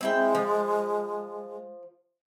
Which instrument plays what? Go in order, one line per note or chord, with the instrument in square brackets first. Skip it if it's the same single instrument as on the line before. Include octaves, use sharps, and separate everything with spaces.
[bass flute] G#3 [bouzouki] C4 E4 G5
[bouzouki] F3